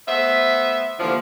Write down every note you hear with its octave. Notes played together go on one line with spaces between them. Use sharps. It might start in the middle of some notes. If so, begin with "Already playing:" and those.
A3 B3 C5 E5
A2 D3 E3 F3 G3 A#3